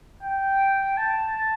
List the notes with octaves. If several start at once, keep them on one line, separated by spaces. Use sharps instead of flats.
G5
A5